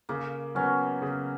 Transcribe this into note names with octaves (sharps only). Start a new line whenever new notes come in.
C#3 A#3
F#3 B3 C#4 F#4
C#3